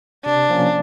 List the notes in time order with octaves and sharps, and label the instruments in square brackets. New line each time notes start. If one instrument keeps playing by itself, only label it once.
[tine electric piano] C3 [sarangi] D4
[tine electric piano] F3 A#3 C#4